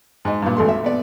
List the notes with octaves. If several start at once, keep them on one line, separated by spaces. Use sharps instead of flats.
G#2 D#5
G2 A#2
G#1 A3 C6
E5
B3 D5